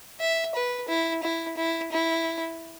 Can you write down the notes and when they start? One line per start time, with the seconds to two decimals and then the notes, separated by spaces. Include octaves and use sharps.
0.21 E5
0.55 B4
0.89 E4
1.23 E4
1.57 E4
1.92 E4